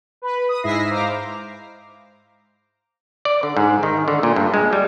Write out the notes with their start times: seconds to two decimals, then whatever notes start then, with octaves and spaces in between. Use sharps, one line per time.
0.22 B4 B5
0.49 D#6
0.63 G#2 G#3 E4 E5 A#6 C7
0.91 C5 F5 A#5 D6
3.25 D5
3.43 D3
3.57 G#2
3.83 D#3
4.08 D3
4.23 A#2
4.36 G2
4.54 G#3
4.73 G3